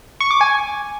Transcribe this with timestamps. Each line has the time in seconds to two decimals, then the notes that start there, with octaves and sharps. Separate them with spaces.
0.20 C#6
0.31 D6
0.41 G#5